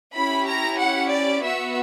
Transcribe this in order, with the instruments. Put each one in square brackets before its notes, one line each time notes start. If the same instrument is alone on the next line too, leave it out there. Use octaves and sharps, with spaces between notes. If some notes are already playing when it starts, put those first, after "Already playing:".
[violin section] C#4 E4 G4 B5
A#5
F#5
D5
B3 F#4 E5